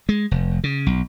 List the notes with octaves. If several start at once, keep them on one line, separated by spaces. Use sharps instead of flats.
G#3
F1
C#3
B1